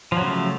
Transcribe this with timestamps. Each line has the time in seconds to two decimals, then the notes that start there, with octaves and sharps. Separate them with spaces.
0.12 F3
0.17 F#3
0.21 C#3
0.26 A3